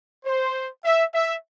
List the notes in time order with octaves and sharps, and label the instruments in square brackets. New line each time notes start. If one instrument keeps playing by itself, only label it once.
[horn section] C5
E5
E5